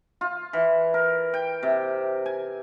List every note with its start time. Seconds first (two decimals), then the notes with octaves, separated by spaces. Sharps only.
0.21 F4
0.53 E3
0.94 A#4
1.34 G5
1.63 C3
2.26 G#5